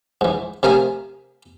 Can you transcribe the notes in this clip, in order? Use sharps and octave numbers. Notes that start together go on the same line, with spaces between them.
G#2 E3
C3 A3 A#4 F5 G#5 D#6